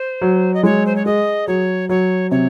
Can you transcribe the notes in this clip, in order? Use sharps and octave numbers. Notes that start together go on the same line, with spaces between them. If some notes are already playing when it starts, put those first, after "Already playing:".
Already playing: C5
F#3
D#5
G#3 C#5
C5
C#5
G#4 D#5
F#3 C#5
F#3 C#5
C3 C#5